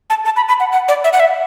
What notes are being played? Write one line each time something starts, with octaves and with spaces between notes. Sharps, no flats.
A5
A5
B5
B5
F#5
F#5
D5
E5
F#5
E5